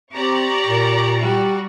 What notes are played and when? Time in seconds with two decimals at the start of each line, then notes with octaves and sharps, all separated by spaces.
0.13 C4 G4 D5 A#5 C#6
0.67 A#2 A#4
1.18 G3 F#4 G4